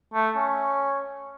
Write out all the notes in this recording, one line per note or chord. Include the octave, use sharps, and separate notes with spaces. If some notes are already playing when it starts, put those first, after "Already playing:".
A3
C#4